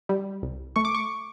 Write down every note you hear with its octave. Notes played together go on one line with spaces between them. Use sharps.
G3
C2
A3 C#6
D6
C#6